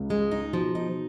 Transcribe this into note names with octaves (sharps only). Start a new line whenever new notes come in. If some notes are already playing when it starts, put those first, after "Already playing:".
Already playing: C#2 C#3
G#3
D#4
B2 F3
B2 D#4